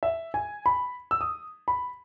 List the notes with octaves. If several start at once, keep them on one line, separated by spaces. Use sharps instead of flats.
E5
G#5
B5
E6
D#6
B5